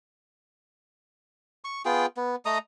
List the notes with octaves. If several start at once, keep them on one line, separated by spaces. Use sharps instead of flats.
C#6
B3 F4 G#4 G5
B3
A3 D#5 A#5 D#6